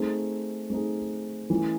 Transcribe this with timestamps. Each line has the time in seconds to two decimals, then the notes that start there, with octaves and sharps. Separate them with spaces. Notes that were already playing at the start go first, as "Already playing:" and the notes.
Already playing: A3 C4 D#4 G#4
0.70 A3 C4 D#4 G#4
1.50 E3 A3 C#4 E4